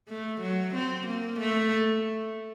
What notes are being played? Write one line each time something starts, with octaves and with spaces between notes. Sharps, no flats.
A3
F#3
C4
A#3
A3